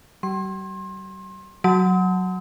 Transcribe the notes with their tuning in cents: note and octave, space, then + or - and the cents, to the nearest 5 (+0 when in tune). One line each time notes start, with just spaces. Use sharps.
G3 -45 C6 +30
F#3 +0 A5 +0 D#6 +45